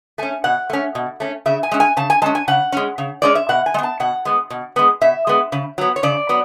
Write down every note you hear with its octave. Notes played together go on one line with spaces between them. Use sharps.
A3 C#4 G#5
B2 F#5
A3 C#4
B2
A3 C#4
C#3 E5
G#5
G#3 C#4
G#5
C#3 A5
G#5
G#3 C#4 A5
G#5
C#3 F#5
G#3 C#4
C#3
G#3 C#4 D5
E5
B2 F#5
G#5
G#3
B3 A5
B2 F#5
G#3 B3
B2
G#3 B3
B2 E5
G#3 B3
C#3
F#3 B3
C#5
C#3 D5
F#3 B3